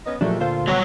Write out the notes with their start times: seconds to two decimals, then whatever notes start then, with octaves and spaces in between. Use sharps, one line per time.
0.05 B3 C#4 D#5
0.21 G2 A#2 F3 F#3 G#3 A3 D4
0.40 D2 F4 A4 C5
0.67 B2 F#3 G3 C#5 F#5